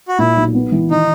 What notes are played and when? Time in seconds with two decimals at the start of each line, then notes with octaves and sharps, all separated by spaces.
0.08 F#4
0.19 A#2 E4
0.36 B1
0.55 B3
0.72 E3
0.90 D#3 D#4